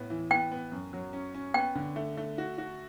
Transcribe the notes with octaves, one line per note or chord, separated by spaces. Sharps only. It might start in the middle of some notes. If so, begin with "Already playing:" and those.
Already playing: A2 B3
E3
B3 G5
B3
F#2
F#3
C#4
C#4
B3 G5
D3
A3
A3
F#4
F#4